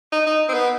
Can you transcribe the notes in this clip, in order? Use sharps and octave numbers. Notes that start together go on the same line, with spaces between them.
D#4
D#4
C4
B3